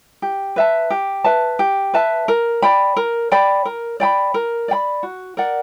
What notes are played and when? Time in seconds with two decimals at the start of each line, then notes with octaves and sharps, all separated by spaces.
0.22 G4
0.56 B4 E5 A5
0.90 G4
1.24 B4 E5 A5
1.59 G4
1.94 B4 E5 A5
2.28 A#4
2.62 D5 G5 B5
2.96 A#4
3.32 D5 G5 B5
3.65 A#4
4.00 D5 G5 B5
4.34 A#4
4.68 D5 G5 B5
5.03 F#4
5.37 A#4 D5 F#5